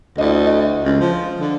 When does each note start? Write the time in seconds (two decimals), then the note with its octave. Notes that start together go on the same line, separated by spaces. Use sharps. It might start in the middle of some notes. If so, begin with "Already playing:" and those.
0.18 D2 E4 D5 D#5
0.46 D#5
0.84 C#2
1.01 F3
1.40 D3